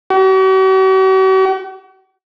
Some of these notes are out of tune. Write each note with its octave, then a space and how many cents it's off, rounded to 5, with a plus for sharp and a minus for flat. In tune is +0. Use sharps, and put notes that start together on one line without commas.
F#4 +45